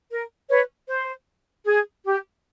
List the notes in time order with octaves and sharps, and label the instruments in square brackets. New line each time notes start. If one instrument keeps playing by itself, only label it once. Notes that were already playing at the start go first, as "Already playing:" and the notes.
[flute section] A#4
B4 C#5
C5
G#4
G4